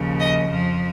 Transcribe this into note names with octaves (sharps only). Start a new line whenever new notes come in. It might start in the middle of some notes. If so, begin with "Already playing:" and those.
Already playing: D#2 C#3 F3
D#5
F2 F3